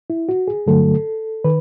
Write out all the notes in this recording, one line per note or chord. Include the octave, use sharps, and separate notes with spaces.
E4
F#4
G#4
G2 D3 F#3 A3 A4
D#3 B4